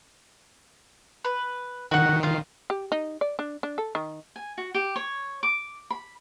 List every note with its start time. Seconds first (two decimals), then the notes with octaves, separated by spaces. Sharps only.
1.25 B4
1.91 D#3 F#4 F#5
2.23 F4 F5
2.70 G4
2.92 D#4
3.21 D5
3.39 D4
3.63 D4
3.78 A4
3.95 D#3
4.36 G#5
4.58 F#4
4.75 G4
4.96 C#5
5.43 D6
5.90 B5